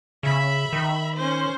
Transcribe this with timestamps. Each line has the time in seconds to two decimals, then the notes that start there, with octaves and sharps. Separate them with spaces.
0.23 C#3 E5 B5
0.73 D#3
1.16 C#4 C5